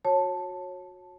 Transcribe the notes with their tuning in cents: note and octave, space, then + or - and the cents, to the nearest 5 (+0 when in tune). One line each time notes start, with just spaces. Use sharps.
F#4 -25 C#5 -20 A5 +0